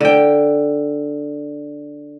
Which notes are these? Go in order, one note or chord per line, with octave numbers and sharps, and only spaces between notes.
D3 G5